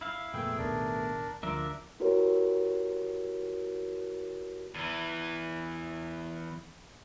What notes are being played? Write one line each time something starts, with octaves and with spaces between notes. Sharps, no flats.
E4 F5
F2 A#2 A3 B3 G#4 G5 E6
A1 D#2 B2 D4 A#4 D5
D2 F3 D4 F4 A#4 E5
E4 F#4 G4 A#4 B4 C#5
E2 E3